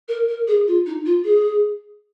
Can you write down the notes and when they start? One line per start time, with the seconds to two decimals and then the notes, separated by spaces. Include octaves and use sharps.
0.08 A#4
0.28 A#4
0.47 G#4
0.67 F4
0.86 D#4
1.05 F4
1.24 G#4